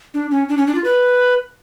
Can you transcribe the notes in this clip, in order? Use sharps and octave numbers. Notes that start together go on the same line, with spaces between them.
D4
C#4
D4
C#4
D4
F4
B4